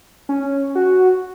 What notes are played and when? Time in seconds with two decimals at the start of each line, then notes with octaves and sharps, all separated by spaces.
0.29 C#4
0.75 F#4